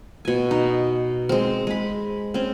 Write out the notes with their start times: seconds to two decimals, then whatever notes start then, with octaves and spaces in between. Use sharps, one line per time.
0.25 B2 G#5
0.51 D#4
1.29 G#3 C4
1.67 G#3 B5
2.34 C4 C#4